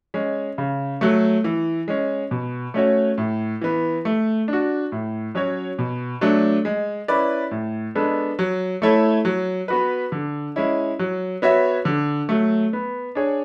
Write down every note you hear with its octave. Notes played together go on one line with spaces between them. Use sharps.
G#3 C#4
C#3
F#3 A3
E3
G#3 C#4
B2
A3 C#4 F#4 C#5
A2
E3 B3
A3
D4 F#4
A2
F#3 C#4 F#4 C#5
B2
F#3 A3 D4
G#3
C#4 E4 B4 D5
A2
G#3 B3 D4 A4
F#3
A3 E4 A4 C#5
F#3
B3 F#4 B4
D3
G#3 C#4 E4
F#3
B3 F#4 C#5 E5
D3
F#3 A3
B3
D4 G#4 C#5